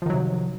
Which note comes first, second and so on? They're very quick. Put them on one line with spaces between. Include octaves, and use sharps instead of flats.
F3 D#3 F#3 C3